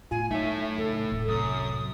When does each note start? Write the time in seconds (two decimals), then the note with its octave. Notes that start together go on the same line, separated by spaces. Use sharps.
0.11 A2 B3 F4 G#5
0.31 F#3 A3 D#4 C#5 E5
0.78 C#2 A2 A4
1.12 D#1 A2
1.28 C2 F#2 D#6